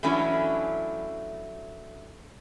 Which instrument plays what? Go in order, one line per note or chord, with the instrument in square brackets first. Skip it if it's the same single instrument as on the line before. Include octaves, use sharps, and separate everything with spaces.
[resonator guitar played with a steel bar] E3 F#3 A3 C#4 D4 E4